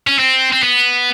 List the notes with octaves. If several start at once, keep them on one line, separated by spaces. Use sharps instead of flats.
C#4
C4
C4
B3